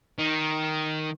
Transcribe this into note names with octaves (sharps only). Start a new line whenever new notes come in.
D#3